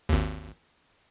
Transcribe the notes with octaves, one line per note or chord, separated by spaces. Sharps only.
G#1 D#2